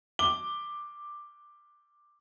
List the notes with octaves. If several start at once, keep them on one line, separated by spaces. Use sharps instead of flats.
D6 G7